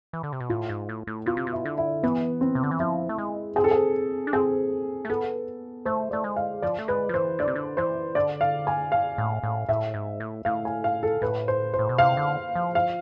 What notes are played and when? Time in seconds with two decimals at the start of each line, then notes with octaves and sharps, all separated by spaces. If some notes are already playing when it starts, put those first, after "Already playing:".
0.13 E3
0.23 D3
0.32 C3
0.40 B2
0.49 A2 F4
0.69 G#2
0.89 A2
1.07 A2
1.26 B2 F4
1.37 C3
1.47 B2
1.53 E4
1.65 D3
1.78 E4
2.03 E3 B3
2.41 C4
2.55 C3
2.63 D3
2.71 E3
2.79 F3 E4
3.09 A3
3.18 G#3
3.56 C4 G#4
3.64 A4
3.71 G#4
4.27 D4
4.33 C4 G#4
5.05 A3
5.10 B3 A4
5.85 A3 C5
6.11 A3 D5
6.24 G#3
6.36 F5
6.62 F3 D5
6.79 A3
6.88 G#3 B4
7.09 F3
7.14 E3 C5
7.39 D3 D5
7.48 C3
7.56 D3
7.77 E3 C5
8.15 D3 D5
8.41 F5
8.67 G#5
8.92 F5
9.18 A2
9.43 A2
9.69 A2 E5
9.94 G#2
10.20 A2
10.45 A2 F5
10.65 G#5
10.84 F5
11.03 A4
11.22 A2 B4
11.48 C5
11.74 C5
11.79 A2
11.89 B2
11.98 C3 F5
12.17 D3
12.55 F3
12.75 F5